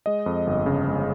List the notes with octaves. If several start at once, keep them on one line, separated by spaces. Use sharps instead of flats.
G#3 D#5
F2
G1
C#3
G#3